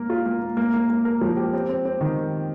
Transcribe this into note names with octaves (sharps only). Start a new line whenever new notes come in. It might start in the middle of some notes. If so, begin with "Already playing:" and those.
Already playing: A#3 A#4
F4
A#3
A#3
A#3
A#3
A#3
A#4
F3
G4
C4
C4
C4
D#3